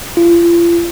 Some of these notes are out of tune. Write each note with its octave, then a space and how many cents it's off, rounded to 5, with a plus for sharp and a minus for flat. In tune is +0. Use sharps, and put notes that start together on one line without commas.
F4 -40